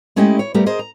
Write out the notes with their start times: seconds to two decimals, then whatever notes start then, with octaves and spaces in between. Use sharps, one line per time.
0.16 G#3 A3 C#4 E4 G4 D#5
0.39 C#5
0.54 G3 A3 B3 G4 A#4
0.66 G#4 A#4 C5 D#5
0.79 A#5